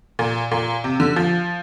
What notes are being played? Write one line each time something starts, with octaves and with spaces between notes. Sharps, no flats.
A#2
A#2
C3
D3
F3